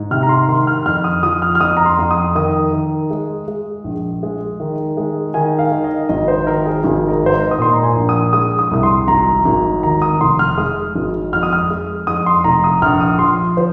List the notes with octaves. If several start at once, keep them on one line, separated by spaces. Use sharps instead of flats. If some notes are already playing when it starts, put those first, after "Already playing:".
Already playing: G#2
C3 F6
A#5
C6
D#3 C6
F6
F2 F6
D#6
F3 D#6
F6
F6
F2 D#6
A#5
C6
F2
D#6
D#3 D#6
D#3
G#3
G#3
A#1
G#3
D#3
G#3
D#3 G#5
F5
D#3
D#5
G#1 D#5
C5
D#3 A#4
G#4
G#1 G#4
A#4
G#2
C5
D#5
D#6
A#2 C6
A#5
G#5
A#1
D#6
G#3 D#6
D#6
C2 D#6
C6
G#1 A#5
G#1
D#2 A#5
D#6
F1 C6
F6
G#3 D#6
G#1
F2 F6
D#6
F6
G#3
F2 D#6
C6
F1 A#5
D#6
A#1 F6
D#6
F3 C6
F3 C5